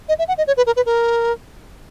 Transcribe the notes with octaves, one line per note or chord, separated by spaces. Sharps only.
D#5
E5
F#5
D#5
C#5
B4
A#4
B4
A#4